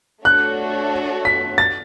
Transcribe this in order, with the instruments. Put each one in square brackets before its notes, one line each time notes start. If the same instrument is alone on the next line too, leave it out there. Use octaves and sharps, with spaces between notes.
[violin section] A3 D4 F#4 A4 C#5 [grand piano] F#6
[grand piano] B6
A6